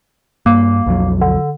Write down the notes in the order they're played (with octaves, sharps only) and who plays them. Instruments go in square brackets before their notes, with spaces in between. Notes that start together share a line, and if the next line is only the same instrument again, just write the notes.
[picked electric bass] G2 [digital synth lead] A#3
[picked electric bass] B1 F2 F#3
[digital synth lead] D3